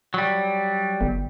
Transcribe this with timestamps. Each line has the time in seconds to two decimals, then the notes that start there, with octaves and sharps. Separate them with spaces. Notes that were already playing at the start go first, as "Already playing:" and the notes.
0.14 F#3 G3
1.01 G1